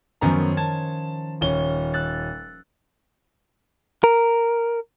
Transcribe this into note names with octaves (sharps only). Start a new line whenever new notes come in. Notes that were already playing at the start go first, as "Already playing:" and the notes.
F#2 D#3 F3 B3 C#4 A#5
A5 G#6
D#1 C#4 G7
E6 F#6 A6
A#4